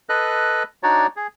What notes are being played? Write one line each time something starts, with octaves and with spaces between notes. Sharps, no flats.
A4 B4 D#5 F#6
D4 D#4 F#4 C#5 D5
G#4